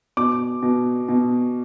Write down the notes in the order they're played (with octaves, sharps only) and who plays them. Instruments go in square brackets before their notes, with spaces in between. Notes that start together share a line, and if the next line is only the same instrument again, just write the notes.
[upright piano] B2 D6
B2
B2